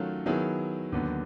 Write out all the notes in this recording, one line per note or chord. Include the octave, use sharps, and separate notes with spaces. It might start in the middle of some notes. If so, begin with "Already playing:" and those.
Already playing: D#3 F#3 A3 C#4 F4
D#3 F#3 B3 E4 G#4
D#2 D3 F#3 B3